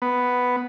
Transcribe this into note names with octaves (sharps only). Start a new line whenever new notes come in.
B3